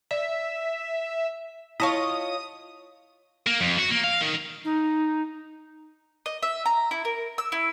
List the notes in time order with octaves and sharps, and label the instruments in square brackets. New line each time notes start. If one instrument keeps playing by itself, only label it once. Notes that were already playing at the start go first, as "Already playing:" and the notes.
[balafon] D5 [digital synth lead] E5
[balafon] E4 A5 C#6 [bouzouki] F4 C#5 D#5 [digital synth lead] D#6
[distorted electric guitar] A#3
F2
F#4
A#3
F5
D#3
[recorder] D#4
[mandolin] D#5
E5
A#5
E4
A#4
E6
E4